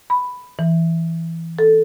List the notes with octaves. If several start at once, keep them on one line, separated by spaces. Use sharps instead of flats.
B5
E3
A4